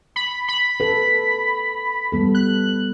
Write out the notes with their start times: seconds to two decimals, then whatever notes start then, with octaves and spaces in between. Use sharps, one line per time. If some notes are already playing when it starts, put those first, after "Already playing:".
0.16 B5
0.48 B5
0.80 A4 B4
2.12 G3 B3 A4
2.35 F#6